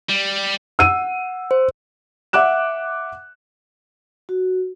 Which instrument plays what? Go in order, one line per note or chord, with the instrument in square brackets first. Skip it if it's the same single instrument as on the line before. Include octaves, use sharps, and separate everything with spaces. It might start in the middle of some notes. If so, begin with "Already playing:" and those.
[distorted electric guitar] G3
[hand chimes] F#5 [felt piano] E6 D#7
[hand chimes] C5
[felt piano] E5 F#5 D6 F#6 E7
[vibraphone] F#4